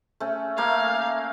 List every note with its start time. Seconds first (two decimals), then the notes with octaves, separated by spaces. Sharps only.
0.20 A3 C#4
0.58 A3 A#3 C#5 F5